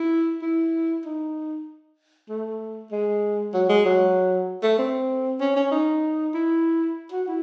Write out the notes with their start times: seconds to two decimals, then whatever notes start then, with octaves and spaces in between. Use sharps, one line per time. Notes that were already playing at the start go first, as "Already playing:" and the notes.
Already playing: E4
0.42 E4
1.05 D#4
2.29 A3
2.91 G#3
3.54 F#3
3.69 G#3
3.85 F#3
4.63 A3
4.79 C4
5.40 C#4
5.56 C#4
5.72 D#4
6.34 E4
7.12 F#4
7.28 E4